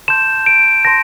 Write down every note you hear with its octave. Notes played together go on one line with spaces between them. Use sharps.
A5 C6 G6 E7
D7
A5 C6 A#6